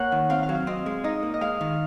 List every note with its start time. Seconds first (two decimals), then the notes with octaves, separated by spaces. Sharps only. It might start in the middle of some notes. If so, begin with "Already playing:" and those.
Already playing: A#3 C#5 F#5
0.12 D#3
0.30 C4 F5
0.43 F5
0.49 F#3
0.55 F5
0.67 C4 D#5
0.86 G#3
1.04 D#4 D#5
1.23 A#3
1.34 D#5
1.41 G#3 F5
1.61 D#3